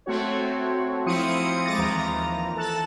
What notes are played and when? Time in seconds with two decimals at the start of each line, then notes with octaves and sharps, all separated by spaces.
0.06 A3 C4 F#4 C#5
1.06 F3 C4 E4 D#6 C#7 D#7
1.65 G#3 D6 D#6 A6 A#6
1.78 D#2 E3 F3 A#5
2.56 A4 A5 F#6